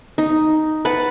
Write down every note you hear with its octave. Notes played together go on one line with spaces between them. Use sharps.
D#4
B4 F#5 A5